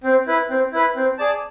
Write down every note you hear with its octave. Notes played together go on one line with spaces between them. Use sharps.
C4
E4 B4
C4
E4 B4
C4
G#4 D5 A5